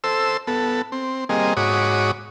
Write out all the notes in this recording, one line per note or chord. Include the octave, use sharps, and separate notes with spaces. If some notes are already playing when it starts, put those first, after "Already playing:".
A4 C5 E6
B3 A4
C4
G3 A#3 C4 G#4 D#5
G#2 F#4 C#5 B5 D6 D#6